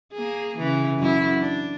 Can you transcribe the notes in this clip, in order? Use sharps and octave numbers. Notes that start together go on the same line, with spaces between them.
A#3 G#4
C#3 E3
F#2 E4
D4